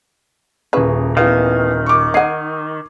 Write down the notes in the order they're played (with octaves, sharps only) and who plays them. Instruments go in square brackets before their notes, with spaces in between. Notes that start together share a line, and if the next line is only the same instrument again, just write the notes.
[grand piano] D#1 A#3 G#4 [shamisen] C#4 E4 B4
[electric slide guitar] D#3 [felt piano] E3 B3 F5
[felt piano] C#6 D6
[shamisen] D#4 F#5 [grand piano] G#6 C7 D#7